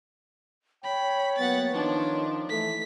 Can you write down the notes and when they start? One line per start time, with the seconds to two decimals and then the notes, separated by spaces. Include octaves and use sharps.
0.84 C#5 G5 B5
1.37 F#3 A#3 B3 F#5 A6
1.74 D#3 F3 D4 D#4
2.49 E3 A3 B6